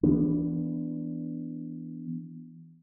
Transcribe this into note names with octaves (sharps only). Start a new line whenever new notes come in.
E3 B3 D4